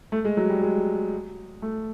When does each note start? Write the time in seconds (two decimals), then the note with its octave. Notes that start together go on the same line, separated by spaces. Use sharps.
0.12 A3
0.25 G#3
0.37 F#3
0.50 G3
0.62 G#3
1.62 A3